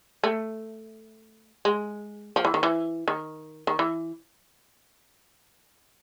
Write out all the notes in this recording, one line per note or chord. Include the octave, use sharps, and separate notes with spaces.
A3
G#3
F3
E3
D#3
E3
D#3
D#3
E3